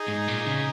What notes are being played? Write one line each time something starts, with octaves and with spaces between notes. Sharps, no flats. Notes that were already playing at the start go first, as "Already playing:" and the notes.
Already playing: D#4 G#4
G#2
A#2
C#3